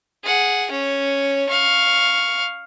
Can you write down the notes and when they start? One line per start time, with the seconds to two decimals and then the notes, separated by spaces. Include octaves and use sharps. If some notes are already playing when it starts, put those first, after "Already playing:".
0.24 G#4 F#5
0.71 C#4 C#5
1.49 F5 C#6